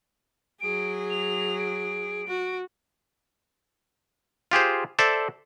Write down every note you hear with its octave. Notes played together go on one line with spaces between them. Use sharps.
F#3 G#4 D7
F7
D7
F#4
F4 G4 G#4 C5
A4 C5 D5 E5